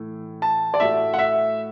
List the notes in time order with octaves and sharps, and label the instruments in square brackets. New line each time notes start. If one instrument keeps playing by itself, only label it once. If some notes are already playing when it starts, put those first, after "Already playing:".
Already playing: [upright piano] A2 E3 A3
[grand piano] A5
D5
[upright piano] A2 A3 F#4 [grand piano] E5
[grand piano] F#5
E5